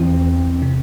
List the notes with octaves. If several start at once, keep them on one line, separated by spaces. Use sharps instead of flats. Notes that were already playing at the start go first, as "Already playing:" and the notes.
Already playing: E2 E3 C4
C3